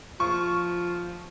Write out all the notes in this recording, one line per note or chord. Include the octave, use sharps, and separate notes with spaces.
F3 C#6